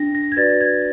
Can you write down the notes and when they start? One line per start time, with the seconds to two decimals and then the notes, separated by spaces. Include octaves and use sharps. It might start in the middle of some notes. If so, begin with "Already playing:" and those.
Already playing: D4 A#6
0.15 A#6
0.32 G#6
0.36 F#4 B4 D5 A6
0.61 G#6